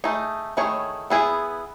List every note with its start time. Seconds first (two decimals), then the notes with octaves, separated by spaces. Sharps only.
0.04 A3 D#4 G#4
0.57 D#3 A3 E4 G#4 C#5
1.10 B3 E4 G#4